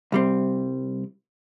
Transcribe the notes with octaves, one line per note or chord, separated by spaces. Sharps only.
C2 G3 C4